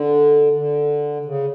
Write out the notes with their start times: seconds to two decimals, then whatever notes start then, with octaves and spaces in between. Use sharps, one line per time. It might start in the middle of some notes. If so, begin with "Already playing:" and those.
Already playing: D3
0.56 D3
1.25 C#3